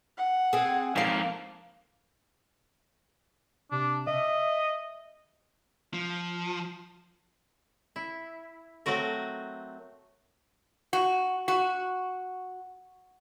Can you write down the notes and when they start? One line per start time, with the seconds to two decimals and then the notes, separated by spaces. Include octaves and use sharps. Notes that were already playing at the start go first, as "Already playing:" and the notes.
0.17 F#5
0.53 C4 G#4
0.96 G#2 F3 A#3 F5
3.71 C3 D4
4.07 D#5 E5
5.94 F3
7.96 E4
8.86 F#3 A3 C4 F#4 A#4
10.93 F#4
11.48 F#4